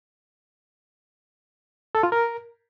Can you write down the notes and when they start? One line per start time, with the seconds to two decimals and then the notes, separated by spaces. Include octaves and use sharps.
1.95 A4
2.03 F4
2.12 A#4